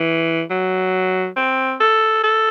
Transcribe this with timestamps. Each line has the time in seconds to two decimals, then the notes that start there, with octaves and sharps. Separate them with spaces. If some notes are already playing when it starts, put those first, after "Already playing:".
Already playing: E3
0.50 F#3
1.36 C4
1.80 A4
2.24 A4